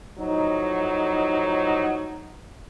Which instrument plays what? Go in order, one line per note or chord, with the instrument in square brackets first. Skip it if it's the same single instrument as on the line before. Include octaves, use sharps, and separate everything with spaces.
[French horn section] A2 F3 F#3 D#4